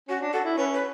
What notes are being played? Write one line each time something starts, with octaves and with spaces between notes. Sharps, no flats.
C#4 F#4
D4
F#4 A4
E4
C#4 B4
B4